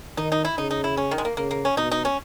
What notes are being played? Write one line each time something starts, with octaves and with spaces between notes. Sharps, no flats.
D#3 D#4
D#4
E4
C#3 D#4
D#4
E4
C#4
D#3
G#3
A#3
C#3 A#3
A#3
C#4
B2 D#4
D#4
C#4